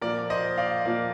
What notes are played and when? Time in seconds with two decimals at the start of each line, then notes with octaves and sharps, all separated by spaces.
0.02 A#2 F3 A#3 A#4 D5
0.30 C5 D#5
0.58 D5 F5
0.85 A#2 F3 A#3